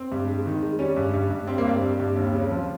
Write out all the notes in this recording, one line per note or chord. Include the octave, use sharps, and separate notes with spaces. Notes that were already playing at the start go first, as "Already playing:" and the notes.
Already playing: C4
G2
G#3
D#3
G#3
G3 C#4
G2
G2
G2
G3 C4
A#3
G2 C4
G3
G2
D#2
C#3
F3